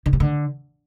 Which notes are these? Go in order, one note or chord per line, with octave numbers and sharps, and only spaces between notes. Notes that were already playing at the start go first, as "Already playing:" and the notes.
D3
C3
D3